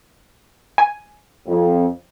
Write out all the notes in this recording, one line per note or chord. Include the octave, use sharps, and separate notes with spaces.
G#5
F2